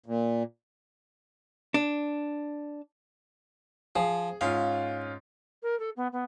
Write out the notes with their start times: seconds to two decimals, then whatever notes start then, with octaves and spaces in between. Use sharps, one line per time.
0.06 A#2
1.74 D4
3.96 F3 G#4
4.41 G#2 C#4 F4 F5
5.62 A#4
5.79 A4
5.96 B3
6.12 B3